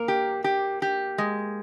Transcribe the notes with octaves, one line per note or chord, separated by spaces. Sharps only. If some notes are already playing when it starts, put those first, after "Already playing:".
Already playing: A#3 A#4
G4
G4
G4
G#3